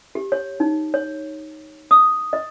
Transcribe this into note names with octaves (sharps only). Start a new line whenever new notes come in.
G4
C#5
D#4
C#5
D#6
D#5